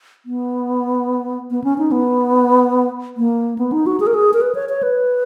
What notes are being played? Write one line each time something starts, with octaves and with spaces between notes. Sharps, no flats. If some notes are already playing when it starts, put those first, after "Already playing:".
B3
B3
C#4
D#4
B3
A#3
B3
D#4
F#4
G#4
A#4
G#4
A#4
B4
C#5
C#5
B4